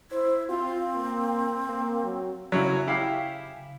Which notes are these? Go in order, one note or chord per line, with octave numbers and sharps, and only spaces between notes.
E4 C5
C4 F4
A#3
A#3
F#3
C#3 F#3 C#4 E4
E4 G4 F5